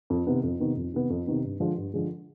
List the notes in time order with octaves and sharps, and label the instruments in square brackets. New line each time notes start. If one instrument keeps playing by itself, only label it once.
[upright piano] F2
C3 D#3 B3
F2
C3 D#3 B3
F2
C3 D#3 B3
F2
C3 D#3 B3
G2
D3 F3 G#3
G2
D3 F3 G#3